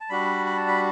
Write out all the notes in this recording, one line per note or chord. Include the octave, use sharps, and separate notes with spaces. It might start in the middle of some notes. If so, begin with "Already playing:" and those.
A5
G3 D4 F#4 B5
B5
A5
B5